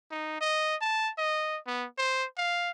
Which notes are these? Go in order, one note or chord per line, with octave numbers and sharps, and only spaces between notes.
D#4
D#5
A5
D#5
B3
C5
F5